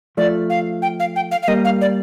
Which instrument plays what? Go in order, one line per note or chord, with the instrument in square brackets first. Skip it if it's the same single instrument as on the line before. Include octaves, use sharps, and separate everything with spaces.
[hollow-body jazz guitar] F3 A3 [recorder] D5
[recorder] F5
G5
F5
G5
F5
F5
[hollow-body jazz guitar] G3 A#3 [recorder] D#5
[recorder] F5
D5